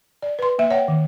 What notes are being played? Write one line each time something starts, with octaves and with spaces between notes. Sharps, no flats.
D5
B4 C6
A#3 E5
C#5 F#5 G5
D#3